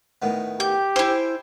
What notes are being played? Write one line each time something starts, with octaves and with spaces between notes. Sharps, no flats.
A2 D#3 B3
G4 G6
E4 C5 G5 G#5 D6